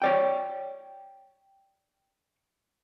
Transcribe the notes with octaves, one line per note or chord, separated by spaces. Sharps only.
C#5 D5 G5